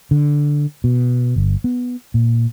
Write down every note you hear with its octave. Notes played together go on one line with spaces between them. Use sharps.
D3
B2
G1
B3
A#2